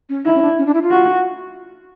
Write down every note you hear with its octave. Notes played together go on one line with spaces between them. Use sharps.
C#4
D#4 E4
C#4
D4
C#4
D4
E4
F4
F#4